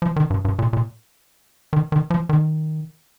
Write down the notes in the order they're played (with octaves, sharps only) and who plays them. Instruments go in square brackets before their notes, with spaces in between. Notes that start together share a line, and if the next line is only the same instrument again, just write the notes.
[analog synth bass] F3
D#3
G2
G2
A#2
A#2
D#3
D#3
F3
D#3